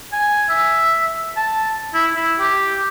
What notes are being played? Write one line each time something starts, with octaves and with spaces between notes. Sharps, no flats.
G#5
E5
A5
E4
E4
G4